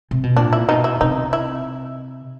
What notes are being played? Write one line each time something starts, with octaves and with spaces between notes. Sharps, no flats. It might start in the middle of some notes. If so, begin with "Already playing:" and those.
C3
B2
A#2 D4
E4
B2 D#4
E4
C3 D#4
E4